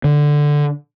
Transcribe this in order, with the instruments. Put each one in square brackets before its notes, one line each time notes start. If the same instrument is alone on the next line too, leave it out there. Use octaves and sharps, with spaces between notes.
[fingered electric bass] D3